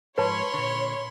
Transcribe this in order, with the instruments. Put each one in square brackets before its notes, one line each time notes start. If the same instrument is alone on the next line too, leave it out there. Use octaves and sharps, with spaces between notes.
[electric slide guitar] G#2 F3 [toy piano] B4 A5 [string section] C#5 [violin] B5 C6
[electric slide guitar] A#2 D3